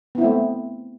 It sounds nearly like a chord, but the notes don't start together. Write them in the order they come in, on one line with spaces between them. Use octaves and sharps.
B3 E4 C4 A3